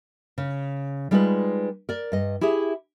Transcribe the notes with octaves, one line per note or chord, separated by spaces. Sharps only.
C#3
G3 G#3 D#4 F4 A#4 B4
A#4 D5
G2 D#5
E4 G4 G#4 E5